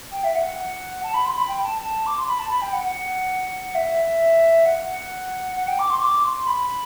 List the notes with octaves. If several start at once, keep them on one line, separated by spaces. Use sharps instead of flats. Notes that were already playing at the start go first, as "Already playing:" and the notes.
G5
E5
F#5
A5
B5
C6
B5
G5
A5
A5
D6
C6
B5
A5
B5
G5
F#5
F#5
E5
F#5
F#5
G5
D6
C6
D6
C6
B5